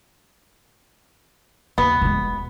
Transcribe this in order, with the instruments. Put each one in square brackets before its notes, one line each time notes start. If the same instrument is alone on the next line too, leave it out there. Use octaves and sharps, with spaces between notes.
[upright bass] D#2 [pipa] B3
[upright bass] E1 G#3